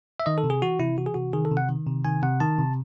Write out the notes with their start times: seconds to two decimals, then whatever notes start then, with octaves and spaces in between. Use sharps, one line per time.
0.20 E5
0.26 D#3 D#5
0.38 A4
0.44 C3
0.50 G#4
0.62 E3 F#4
0.79 C3 E4
0.97 E3 F#4
1.06 G#4
1.14 C3 F#4
1.33 D#3 G#4
1.45 A4
1.51 C3
1.57 F#5
1.69 D#3
1.86 C3
2.05 D#3 G#5
2.23 C3 F#5
2.40 D#3 A5
2.59 C3